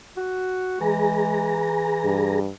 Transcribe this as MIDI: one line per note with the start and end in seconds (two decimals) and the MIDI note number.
0.17 0.79 66
0.80 2.51 52
0.80 1.70 56
0.80 2.40 68
0.80 2.40 82
2.04 2.49 43